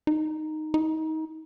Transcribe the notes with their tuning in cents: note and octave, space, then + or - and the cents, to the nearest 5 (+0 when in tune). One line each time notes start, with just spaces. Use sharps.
D#4 -5
D#4 +25